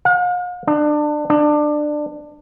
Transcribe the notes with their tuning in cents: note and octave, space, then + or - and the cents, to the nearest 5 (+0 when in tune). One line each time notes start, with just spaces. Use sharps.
F5 +45
D4 +25
D4 +20